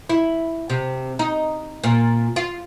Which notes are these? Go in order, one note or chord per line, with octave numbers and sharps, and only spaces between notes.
E4
C3
D#4
A#2
F4